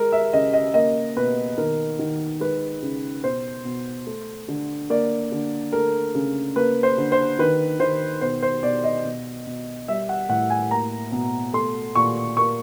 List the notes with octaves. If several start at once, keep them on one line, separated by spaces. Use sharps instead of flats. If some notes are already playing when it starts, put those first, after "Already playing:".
Already playing: G#3 A#4
E5
C#3 D#5
D#5
A#3 D#5
B2 B4
D#3 A#4
D#3
G#3 B4
C#3
B2 C5
B2
A3
D3
A#3 D5
D3
A3 A#4
C#3
A#3 B4
C5
D3
C5
D#3 B4
D#3 C5
B2 C5
C5
B2 D5
D#5
B2
B2
G3 E5
F#5
A2 F#5
G#5
A#3 A#5
B2
A3 C6
A#2 C#6
A#3 C#6